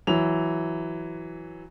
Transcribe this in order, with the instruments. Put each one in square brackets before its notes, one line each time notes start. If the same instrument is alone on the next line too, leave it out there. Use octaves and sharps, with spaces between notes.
[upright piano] E3 F#3 F7